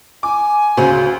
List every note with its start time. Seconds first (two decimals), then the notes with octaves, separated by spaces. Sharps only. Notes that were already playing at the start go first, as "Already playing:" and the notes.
0.23 G#5 D6
0.77 D2 C#3 F#4 C5